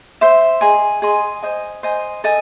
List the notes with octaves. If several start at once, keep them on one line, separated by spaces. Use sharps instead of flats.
C5 E5 C6
G#4 D#5 G#5 C6
G#4 D#5 G#5 C6
C5 D#5 G#5
C5 D#5 G#5
A4 D#5 G#5